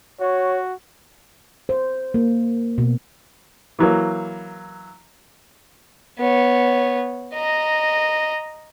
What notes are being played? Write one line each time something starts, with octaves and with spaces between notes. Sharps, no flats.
F#4 C#5
C5
A#3
B2
E3 F#3 A#3
B3 C#5
D#5 A#5